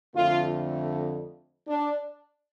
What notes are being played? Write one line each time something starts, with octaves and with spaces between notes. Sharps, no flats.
F2 D3 A3 F4
D4